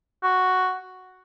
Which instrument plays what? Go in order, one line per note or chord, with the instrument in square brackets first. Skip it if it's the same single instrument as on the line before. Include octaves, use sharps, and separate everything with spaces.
[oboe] F#4